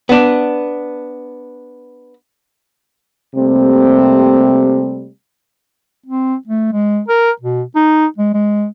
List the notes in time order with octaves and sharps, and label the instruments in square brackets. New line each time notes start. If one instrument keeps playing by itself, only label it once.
[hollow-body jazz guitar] B3 D4
[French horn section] C3 G3 A3 A#3 C4
[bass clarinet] C4
A3
G#3
A#4
B2
D#4
G#3
G#3